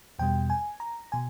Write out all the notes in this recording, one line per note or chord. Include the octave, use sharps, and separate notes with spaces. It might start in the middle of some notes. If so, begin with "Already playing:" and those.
E2 B2 G3 G5
G#5
A#5
B2 G#5